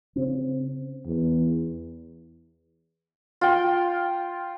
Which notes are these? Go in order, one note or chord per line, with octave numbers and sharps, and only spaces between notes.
C#3 C4
E2
F4 G5